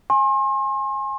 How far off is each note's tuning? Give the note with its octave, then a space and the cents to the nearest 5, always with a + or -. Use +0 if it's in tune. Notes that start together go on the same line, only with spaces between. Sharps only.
G#5 +0 C6 +40